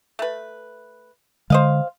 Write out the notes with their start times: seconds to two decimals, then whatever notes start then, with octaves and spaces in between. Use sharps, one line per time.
0.19 A3 B4
1.50 D3 G#3 C5 D#5 F5